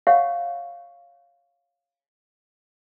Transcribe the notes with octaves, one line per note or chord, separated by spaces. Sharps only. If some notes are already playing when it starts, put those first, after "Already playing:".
C#5 F5 F#5 C#6